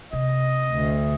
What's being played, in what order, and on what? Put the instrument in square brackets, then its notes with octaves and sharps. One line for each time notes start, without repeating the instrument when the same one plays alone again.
[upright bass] C3 [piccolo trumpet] D#5
[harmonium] D2